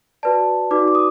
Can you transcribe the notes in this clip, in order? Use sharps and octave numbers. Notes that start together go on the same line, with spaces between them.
F#4 B4 D5 A5
D#4 F#4 B4 D5 D6
D6
D#6